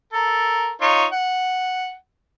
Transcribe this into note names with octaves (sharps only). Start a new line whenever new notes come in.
A4 A#4
D#4 F4 C#5
F#5